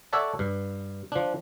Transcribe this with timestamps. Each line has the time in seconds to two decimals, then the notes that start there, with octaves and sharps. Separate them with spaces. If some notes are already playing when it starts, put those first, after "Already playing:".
0.13 A4 C#5 D5 E5 F#5 A5
0.39 G2
1.12 F3 D4